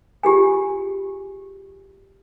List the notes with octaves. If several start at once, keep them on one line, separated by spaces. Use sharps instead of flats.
F4 G4 G#4 G#5